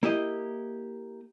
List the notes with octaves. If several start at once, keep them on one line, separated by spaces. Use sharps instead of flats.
A#3 E4 G4 D#5